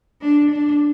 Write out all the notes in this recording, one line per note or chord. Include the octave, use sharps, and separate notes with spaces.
D4
D4